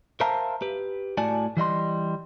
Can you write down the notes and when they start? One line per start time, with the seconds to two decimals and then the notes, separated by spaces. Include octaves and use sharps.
0.20 A#4 C5 E5 F5 A5 A#5
0.62 G4 B4
1.17 A2 F#4 D5 G#5 A5
1.57 E3 G3 D#5 C6